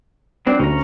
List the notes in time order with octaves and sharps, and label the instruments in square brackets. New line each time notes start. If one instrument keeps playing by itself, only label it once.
[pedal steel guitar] F#3 C4 D4
[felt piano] D2 [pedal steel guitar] C#4 A#5